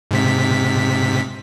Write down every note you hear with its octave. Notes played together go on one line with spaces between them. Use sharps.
G#2 C3 B6